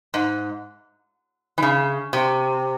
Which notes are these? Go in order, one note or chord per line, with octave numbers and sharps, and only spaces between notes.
G#2
E3
C#3
C3